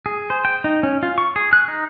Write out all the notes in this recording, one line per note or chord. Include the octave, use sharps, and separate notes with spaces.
G#4
C5
G5
D#4
C#4
F4
C#6
G#4
F#6
D#4